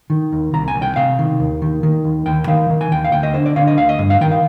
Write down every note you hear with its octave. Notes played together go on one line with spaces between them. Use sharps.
D#3
D#2
C2 A#5
G#5
C2
G5
C3 F5
D#3
D#2
D#3
D#3
D#2
D#2 G5
D#3 F5
D#3
G#5
D#2 G5
F5
D2 G5
D#5
D3 C5
D5
D3 F5
D#5
D2 F5
D#5
G2
F5
D#3 G5
F5